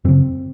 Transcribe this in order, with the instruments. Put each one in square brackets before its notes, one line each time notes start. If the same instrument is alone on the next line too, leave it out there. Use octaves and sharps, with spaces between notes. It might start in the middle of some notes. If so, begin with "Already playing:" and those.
[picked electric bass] F#2 C#3 C4